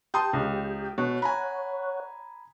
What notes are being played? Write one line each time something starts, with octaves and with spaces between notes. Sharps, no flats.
G4 G5 A5 C6 D#6
C#2
B2 C#5 F#5
G#5 A#5 B5